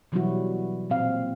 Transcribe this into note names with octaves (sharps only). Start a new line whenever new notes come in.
B2 E3 F#3 G3 E4 F#4
A#2 C4 F5